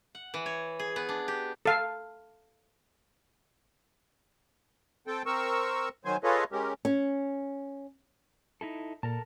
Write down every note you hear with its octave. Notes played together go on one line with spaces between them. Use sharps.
F#5
E3
C#5
G#4
B3
D4
G4
A4 F5
C4 A4 G5
C4 A#4 C#6 E6
D#3 F#3 C5 G#5
F4 G#4 A4 B4 C#5 D#5
G#3 C#4 G4 A#4
C#4
D#4 E4 A4
A#2 A4 A#4 A5